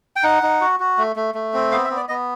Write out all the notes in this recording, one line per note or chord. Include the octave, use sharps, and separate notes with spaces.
G5
D#4 F#5
D#4
F#4
F#4
A3
A3
A3
C4
B3 F5
E5
B3
D5
B3 D#5